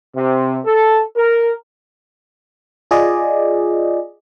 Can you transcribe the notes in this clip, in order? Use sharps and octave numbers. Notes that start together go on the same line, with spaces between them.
C3
A4
A#4
F4 G#4 D5 D#5